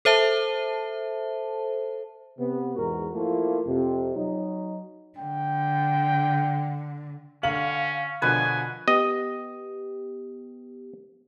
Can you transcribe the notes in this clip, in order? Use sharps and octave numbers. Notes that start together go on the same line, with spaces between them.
A4 C5 E5 A5
C3 B3
E2 G#2 F#4 A#4
F3 A3 A#3 E4 F4
F2 C3
F#3 D#4
D3 G5
D3 C#4 F5 F#7
B2 D3 F3 B4 G#5
B3 G4 D#5